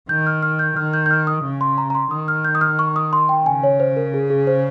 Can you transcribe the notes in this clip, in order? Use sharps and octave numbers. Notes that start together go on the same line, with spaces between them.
D#3 G6
F6
F6
G6
D#3 F6
G6
G6
F6
D#6
C#3
C6
A#5
A#5
C6
D#3 D#6
F6
G6
D#6
F6
C#6
D#6
C6
G5
C#3 G#5
C#5
C5
A#4
G#4
G#4
C5